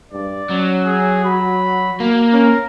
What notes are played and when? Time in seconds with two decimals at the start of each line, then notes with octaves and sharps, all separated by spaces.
0.12 G2 D5
0.50 F#3 C#4
0.86 G#4
1.25 F#4 B5
2.00 A#3
2.33 C#4 A#4